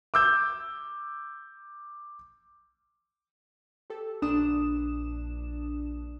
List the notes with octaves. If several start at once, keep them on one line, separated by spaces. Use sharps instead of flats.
D6 E6 G6
G4 A4
A#1 D4 D#6 E7